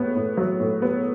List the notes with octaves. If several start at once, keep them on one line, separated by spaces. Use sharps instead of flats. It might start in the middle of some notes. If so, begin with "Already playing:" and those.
Already playing: A2 B3
A2
F#3
A2
B3